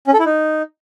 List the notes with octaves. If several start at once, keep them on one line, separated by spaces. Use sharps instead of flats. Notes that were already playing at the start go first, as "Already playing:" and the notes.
C#4
A4
E4
D#4